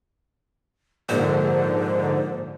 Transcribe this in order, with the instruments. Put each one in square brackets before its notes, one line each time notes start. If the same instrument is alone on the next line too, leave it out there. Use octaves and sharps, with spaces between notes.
[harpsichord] A#1 [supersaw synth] G#2 D3 [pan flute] C5